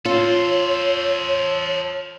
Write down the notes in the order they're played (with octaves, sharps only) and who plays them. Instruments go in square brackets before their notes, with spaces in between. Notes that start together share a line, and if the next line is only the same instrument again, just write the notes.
[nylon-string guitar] F4 [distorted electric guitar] A4 C5 [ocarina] C#5